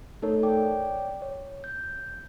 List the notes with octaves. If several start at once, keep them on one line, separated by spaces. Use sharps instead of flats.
A3 D#4 A4 A#4 C#5
C#5 D5 G5 D6
C#5
G6